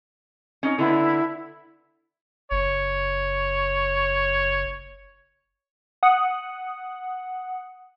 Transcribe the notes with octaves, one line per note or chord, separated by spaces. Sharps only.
C#4 D#4 C#5
D3 B3 E4
F#1 C#5
F#5 D#6